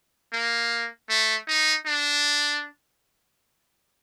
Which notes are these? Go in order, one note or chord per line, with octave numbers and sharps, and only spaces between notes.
A#3
A3
D#4
D4